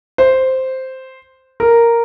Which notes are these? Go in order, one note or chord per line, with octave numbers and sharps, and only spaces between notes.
C5
A#4